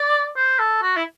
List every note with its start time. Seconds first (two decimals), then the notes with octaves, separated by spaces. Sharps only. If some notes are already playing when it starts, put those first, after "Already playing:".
Already playing: D5
0.37 C5
0.59 A4
0.82 F#4
0.96 E4